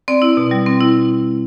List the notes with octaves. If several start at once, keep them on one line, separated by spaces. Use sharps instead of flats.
C4 D5
E4
B2
G3
C4
E4